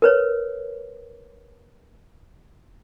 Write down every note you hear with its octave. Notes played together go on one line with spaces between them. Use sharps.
A#4 B4 C#5